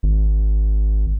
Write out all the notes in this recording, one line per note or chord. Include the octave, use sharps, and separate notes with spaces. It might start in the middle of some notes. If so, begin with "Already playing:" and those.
G#1